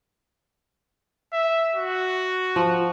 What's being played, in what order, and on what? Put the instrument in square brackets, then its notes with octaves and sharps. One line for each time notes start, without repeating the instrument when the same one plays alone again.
[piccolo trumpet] E5
F#4
[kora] F3